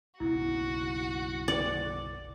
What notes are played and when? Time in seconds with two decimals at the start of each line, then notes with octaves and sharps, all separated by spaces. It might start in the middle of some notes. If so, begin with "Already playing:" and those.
0.20 F#1 B1 E4 F#4
1.48 D5